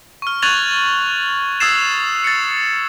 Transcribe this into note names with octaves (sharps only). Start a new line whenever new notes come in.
C#6 F6
C#6 F#6 G#6 A6 F7 F#7
D#6 E6 G#6 A6 C7 E7
A6 C#7